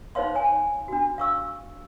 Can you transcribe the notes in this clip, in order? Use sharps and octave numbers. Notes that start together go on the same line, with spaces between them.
D#4 C5 C#5 F5 C6
C#5 G#5
D4 F#4
F5 C#6 E6